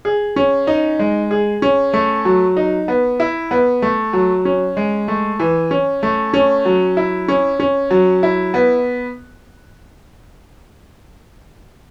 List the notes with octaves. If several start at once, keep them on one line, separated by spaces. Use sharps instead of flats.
G#4
C#4
D#4
G#3
G#4
C#4
A3
F#3
D#4
B3
E4
B3
A3
F#3
C#4
G#3
A3
E3
C#4
A3
C#4
F#3
E4
C#4
C#4
F#3
E4
B3